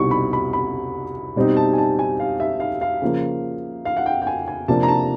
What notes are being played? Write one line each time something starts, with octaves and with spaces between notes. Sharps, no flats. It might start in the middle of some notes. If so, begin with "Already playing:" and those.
Already playing: C2 B2 G3 C4 D#4 C#6
B5
B5
B5
B2 G3 C4 D#4
A5
G#5
A5
G#5
F5
E5
F5
F5
C#3 F3 A#3
F5
F#5
G5
G5
G#5
G#5
C3 F3 A#3 D4 A5
A#5
A5